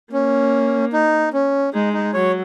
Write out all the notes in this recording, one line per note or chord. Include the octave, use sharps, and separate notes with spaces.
A#3 C#4
D#4
C#4
G#3 D#4
D#4
F#3 C#5